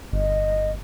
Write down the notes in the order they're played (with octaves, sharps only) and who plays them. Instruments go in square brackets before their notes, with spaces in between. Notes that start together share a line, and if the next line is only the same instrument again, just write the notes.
[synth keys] G1 [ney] D#5